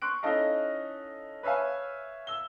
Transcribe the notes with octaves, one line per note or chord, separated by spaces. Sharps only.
C6 C#6 F#6 D7
C#4 D#4 E4 A4 D#5 F5
B4 C#5 E5 F5 G#5
E6 G7